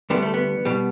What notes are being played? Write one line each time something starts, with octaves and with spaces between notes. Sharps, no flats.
D2 D3 G3 B3
A3
B3
B2 G3